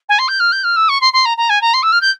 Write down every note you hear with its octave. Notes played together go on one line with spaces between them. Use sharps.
G#5
C6
G6
F6
G6
F6
E6
C#6
C6
C6
A#5
A#5
G#5
A#5
C6
E6
F6
G6